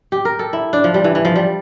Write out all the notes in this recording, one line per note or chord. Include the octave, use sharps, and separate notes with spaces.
G4
A#4
A4
E4
D4
F3
G3
E3
E3
F3
G3